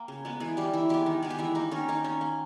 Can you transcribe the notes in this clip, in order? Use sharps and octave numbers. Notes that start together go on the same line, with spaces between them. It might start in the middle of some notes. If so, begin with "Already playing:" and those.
Already playing: A#3 G5
C#3
G#3 B3
E3 G#4
G3 A#3 G4
E3 E4
G#3 B3 G4
D#3
G#3 B3 G#4
G4
E3 E4
A#3 D#4
D#3 C#4
A#3 D#4
D#3 C#4
A#3